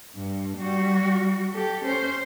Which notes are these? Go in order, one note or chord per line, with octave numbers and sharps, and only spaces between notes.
G2
G3 F#4
G4 A4
C#4 C5